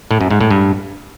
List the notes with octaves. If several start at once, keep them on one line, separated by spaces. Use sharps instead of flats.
A2
F#2
G#2
A2
G2